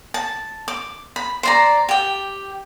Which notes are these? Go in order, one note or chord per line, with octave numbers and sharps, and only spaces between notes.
A5
D6
B5
C5 D5 A#5
G4 G5